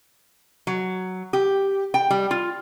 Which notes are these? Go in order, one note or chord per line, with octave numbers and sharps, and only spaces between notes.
F#3
G4
G5
G3
F4